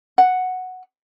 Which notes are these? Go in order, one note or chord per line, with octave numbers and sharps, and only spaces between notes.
F#5